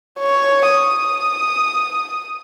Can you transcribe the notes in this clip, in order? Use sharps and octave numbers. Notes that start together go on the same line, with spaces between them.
C#5
D#6